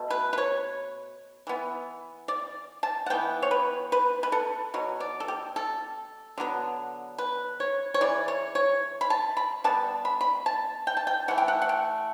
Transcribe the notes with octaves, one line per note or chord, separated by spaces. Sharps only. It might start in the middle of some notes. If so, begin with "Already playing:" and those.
Already playing: B2 A3
B4
B4
C#5
E3 B3
D5
A5
F#5
E3 B3 G5
C#5
B4
B4
B4
A4
B2 F#3
D5
A4
G4
A4
D3 F#3 B3
B4
C#5
C#5
C#3 E3 D5
C#5
C#5
B5
A5
B5
D3 G3 B3 A5
B5
B5
A5
G5
A5
G5
E3 A3 F#5
G5
F#5
F#5
G5